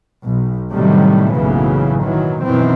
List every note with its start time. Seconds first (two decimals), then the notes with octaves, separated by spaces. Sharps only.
0.24 B1
0.72 A2 C3 D#3 F#3 G3 A3
1.33 F#1 B1 A2 C#3 E3 F#3
2.03 D#3 E3 F#3
2.45 F#2 B2 D#3 E3 C4